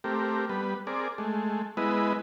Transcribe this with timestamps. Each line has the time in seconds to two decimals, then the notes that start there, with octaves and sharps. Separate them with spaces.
0.04 A3 C4 G4 A#4
0.49 G3 B3 B4
0.87 C4 G#4 A#4 D5
1.18 G#3 A3
1.77 G#3 B3 E4 B4 D#5